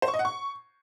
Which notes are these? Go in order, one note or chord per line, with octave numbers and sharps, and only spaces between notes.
C5
C#6
D#5
F#5
C#6